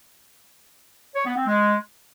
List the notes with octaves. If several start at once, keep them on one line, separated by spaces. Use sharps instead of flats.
C#5
B3
C4
G#3